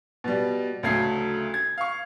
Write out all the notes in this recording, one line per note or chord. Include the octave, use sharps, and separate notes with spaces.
B2 G3
D2 C#3 F#3 A3 G#6 C7
G#6
F5 C#6